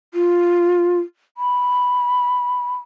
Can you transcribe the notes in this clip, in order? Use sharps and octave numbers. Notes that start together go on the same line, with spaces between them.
F4
B5